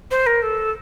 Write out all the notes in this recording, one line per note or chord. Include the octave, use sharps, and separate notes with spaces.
C5
A#4
A4